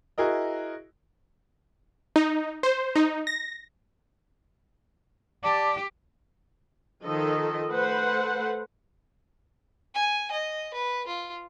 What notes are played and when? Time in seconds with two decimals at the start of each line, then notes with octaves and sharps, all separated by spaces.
0.18 E4 F#4 G#4 A#4 D#5
2.16 D#4
2.63 C5
2.96 D#4
3.27 A#6
5.44 G4 D5 A5
7.04 D#3 F3 A4 D#5
7.69 A3 A4 B4 C5 F#5
9.95 G#5
10.32 D#5
10.74 B4
11.07 F4